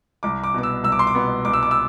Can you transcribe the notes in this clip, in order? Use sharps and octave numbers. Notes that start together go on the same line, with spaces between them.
C2 D6
D6
B2 B3 D6
E6
C2 E6
D6
C6
D6
B2 B3
C2 D6
E6
D6
E6